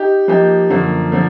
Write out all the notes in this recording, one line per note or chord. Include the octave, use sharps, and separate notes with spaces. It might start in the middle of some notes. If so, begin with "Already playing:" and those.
Already playing: D#4 G4
F3 A#3 D#4 G4
F#2 D3 F3 A#3
D3 F3 A#3